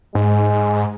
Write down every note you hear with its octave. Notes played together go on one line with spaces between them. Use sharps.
G#2 G#3